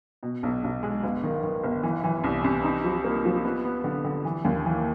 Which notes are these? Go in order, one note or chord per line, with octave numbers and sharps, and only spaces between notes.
B2
B1
B1
G#3
G1
D#3
D#3
G1
E3
E3
C2
C2
D#4
F3
A#3
F3
B3
B3
D3
D3
E3
D#2
E3